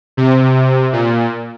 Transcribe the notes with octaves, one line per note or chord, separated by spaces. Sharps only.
C3
A#2